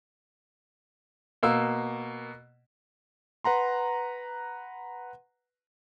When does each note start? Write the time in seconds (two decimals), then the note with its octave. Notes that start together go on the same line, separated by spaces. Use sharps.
1.43 B2 A#3 E6
3.44 B4 F#5 A#5 C6